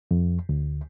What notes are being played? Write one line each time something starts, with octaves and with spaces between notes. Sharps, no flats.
F2
D2